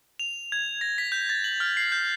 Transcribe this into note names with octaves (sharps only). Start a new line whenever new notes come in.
F7
G#6
A#6
B6
G6
A6
F#7
F6
C7
G6